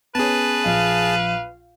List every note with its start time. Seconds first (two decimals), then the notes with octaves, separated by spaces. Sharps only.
0.15 B3 C#4 G#4 B4 C#5 A5
0.65 A#1 F5